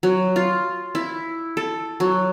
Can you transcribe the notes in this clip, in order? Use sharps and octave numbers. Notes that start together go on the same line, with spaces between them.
F#3
F4
E4
A4
F#3